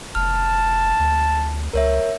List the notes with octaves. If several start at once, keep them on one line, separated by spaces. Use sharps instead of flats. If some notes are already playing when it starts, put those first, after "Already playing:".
F1 A5 F6
D2
C#2 A#4 C#5 E5